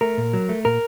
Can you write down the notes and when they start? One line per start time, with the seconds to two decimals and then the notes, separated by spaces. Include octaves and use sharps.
0.01 A3 A#4
0.18 A#2
0.33 F#3
0.49 A3
0.65 A#2 A#4